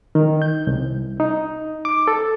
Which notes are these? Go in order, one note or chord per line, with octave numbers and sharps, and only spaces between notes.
D#3
G6
C2
D#4
D6
A4